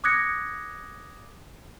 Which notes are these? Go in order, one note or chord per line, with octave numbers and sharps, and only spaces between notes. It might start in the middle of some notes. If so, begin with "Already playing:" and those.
D6 D#6 F#6 G#6 A#6 C#7